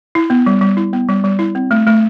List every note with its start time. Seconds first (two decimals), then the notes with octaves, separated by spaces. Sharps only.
0.15 E4
0.30 B3
0.46 G3
0.61 G3
0.77 E4
0.93 B3
1.08 G3
1.24 G3
1.39 E4
1.55 C4
1.71 A3
1.87 A3